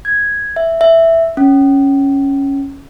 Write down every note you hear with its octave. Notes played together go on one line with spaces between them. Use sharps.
G#6
E5
E5
C#4